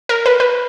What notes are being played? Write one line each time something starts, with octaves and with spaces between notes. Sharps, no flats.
A#4
B4
B4